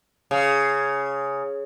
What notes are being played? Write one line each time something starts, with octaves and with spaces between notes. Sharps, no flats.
C#3